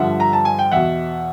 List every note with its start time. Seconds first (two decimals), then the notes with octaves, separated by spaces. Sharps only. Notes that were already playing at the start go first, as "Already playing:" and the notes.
Already playing: G2 D3 F3 E5 F#5
0.20 A#5
0.33 A5
0.45 G#5
0.59 G5
0.72 E2 B2 E5 F#5